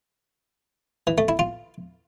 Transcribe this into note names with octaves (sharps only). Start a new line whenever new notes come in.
E3
A3
E4
F4